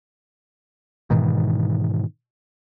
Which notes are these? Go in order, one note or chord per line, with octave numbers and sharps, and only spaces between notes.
G#2 B2 D#3 E3